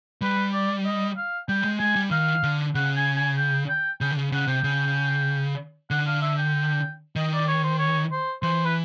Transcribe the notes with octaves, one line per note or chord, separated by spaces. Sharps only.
G3 B4
D5
D#5
F5
G3 G5
G#3
G#3 G#5
G3
D#3 F5
D3
C#3 F#5
G#5
G#5
G5
G5
C#3 G5
D3
C#3
C#3 F#5
C3 G5
C#3
D3 F#5
F5
E5
G5
D#3 D#5
D5
C#5
C5
C#5
C5
E3 C5
B4